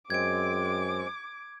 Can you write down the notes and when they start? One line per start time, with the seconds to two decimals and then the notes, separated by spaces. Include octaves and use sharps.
0.10 F#2 G#3 C4 D6 G#6 D7